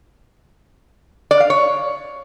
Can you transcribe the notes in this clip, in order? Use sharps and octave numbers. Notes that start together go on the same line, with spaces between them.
D5
F5
C#5